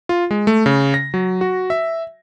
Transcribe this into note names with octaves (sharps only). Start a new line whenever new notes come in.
F4
G#3
A3
C#3
A#6
F#3
F#4
E5